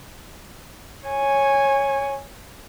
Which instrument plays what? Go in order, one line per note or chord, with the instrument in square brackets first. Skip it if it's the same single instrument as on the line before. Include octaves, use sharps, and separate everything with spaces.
[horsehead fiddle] C#5 G#5